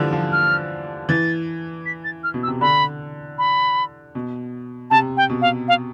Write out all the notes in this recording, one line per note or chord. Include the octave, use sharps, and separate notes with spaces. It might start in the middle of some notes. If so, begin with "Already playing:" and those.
Already playing: D3 E3 F3 G3
F3
F6
E3 A6
B6
A6
F6
B2
E6
C3
D3 B5
B5
B2
C3 A5
G5
B2
F5
F5